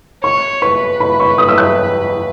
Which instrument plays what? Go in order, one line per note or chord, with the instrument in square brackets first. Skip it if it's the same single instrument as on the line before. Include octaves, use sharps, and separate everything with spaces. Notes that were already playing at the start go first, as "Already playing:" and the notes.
[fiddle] C#5 [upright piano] C#6
[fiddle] B4 [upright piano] C#6
[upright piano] B5
C#6
D#6
E6
F#6